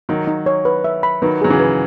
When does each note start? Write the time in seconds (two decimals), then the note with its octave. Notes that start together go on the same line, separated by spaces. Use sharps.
0.09 D#3 F#3 D#4
0.28 D#4
0.46 C#5
0.65 B4
0.84 E5
1.03 B5
1.22 D#3 F#3 B4
1.41 F#3 G#4
1.50 C#3 E3
1.60 B4